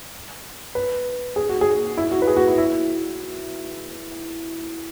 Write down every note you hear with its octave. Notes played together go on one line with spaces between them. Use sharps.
B4
G#4
F#4
G#4
E4
F#4
B4
G#4
F#4
E4
E4